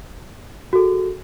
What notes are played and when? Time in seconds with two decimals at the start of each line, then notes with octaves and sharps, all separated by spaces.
0.73 F#4
0.75 A4
0.78 G#4